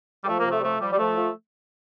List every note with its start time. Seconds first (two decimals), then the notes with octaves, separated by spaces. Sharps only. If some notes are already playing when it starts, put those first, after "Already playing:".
0.24 G3
0.28 F3 A3
0.40 A#3
0.46 C3
0.51 A3
0.59 G3
0.63 F3 A3
0.81 F3 G3
0.92 G3
0.99 F3 A3
1.16 F3